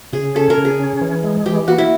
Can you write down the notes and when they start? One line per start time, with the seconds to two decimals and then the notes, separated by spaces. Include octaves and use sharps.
0.13 C#3 G#4
0.35 C#4 A4
0.50 A#4
0.57 C#3
0.65 G#4
0.80 C#4
1.01 E3
1.24 G#3
1.46 E3 G4
1.68 A#3 F#4
1.78 E4